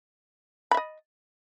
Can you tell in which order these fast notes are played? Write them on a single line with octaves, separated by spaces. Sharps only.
B5 E5 D#5